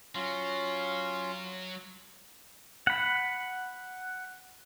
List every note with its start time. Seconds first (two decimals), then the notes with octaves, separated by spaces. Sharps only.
0.15 F#3 C#4 F4 C6
2.87 F#5 B5